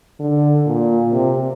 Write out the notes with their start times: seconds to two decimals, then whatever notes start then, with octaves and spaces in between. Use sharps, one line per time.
0.20 D3
0.66 A#2
1.12 C3